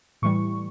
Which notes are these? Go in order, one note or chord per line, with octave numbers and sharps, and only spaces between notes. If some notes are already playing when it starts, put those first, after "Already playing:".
A2 E3 G3 C#6